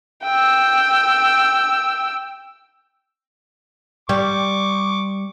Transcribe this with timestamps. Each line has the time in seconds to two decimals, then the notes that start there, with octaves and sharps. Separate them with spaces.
0.23 G5 E6
4.09 G3 C#6 D6